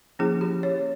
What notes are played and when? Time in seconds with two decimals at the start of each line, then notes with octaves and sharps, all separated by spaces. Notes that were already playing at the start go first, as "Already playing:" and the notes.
0.19 F3 A#3 C#4 E4 G#4
0.41 G4
0.63 C#5